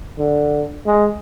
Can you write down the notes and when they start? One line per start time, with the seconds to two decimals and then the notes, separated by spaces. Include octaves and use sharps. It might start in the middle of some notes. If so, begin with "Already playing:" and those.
0.18 D3
0.86 G#3